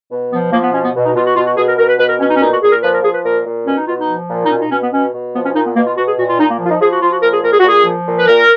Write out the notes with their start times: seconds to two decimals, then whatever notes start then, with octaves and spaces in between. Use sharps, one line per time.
0.11 B2
0.31 F3 B3
0.52 F3 A#3
0.63 B3
0.73 B2 C#4
0.83 B3
0.95 B2
1.05 D#4
1.15 B2 F4
1.26 F#4
1.36 B2 F4
1.46 F#4
1.57 B2 G#4
1.68 A#4
1.78 B2 A#4
1.89 B4
1.99 B2 B4
2.09 A#4
2.19 B2 C#4
2.30 D#4
2.37 C#4
2.40 A#2 D#4
2.51 F#4
2.62 A#2 G#4
2.72 A#4
2.83 F3 B4
2.93 A#4
3.03 F3 G#4
3.14 B4
3.25 A#2 A#4
3.45 A#2
3.66 B2 C#4
3.77 D#4
3.87 B2 F4
3.98 D#4
4.09 F3
4.30 A#2
4.45 D#4
4.50 B2 C#4
4.61 D#4
4.71 B2 C#4
4.82 B3
4.92 B2 C#4
5.14 B2
5.34 F3 B3
5.45 C#4
5.54 A#2 D#4
5.65 B3
5.76 B2 A#3
5.86 F4
5.97 B2 F#4
6.07 G#4
6.18 A#2 F#4
6.28 F4
6.39 A#2 D#4
6.50 A#3
6.59 F3
6.66 F4
6.70 D#4
6.81 F3 G#4
6.91 F#4
7.02 F3 F4
7.12 F#4
7.22 A#2 A#4
7.33 G#4
7.43 A#2 A#4
7.52 G#4
7.59 F#4
7.64 A#2 G#4
7.85 F3
8.07 A#2
8.18 B4
8.27 A#2 A#4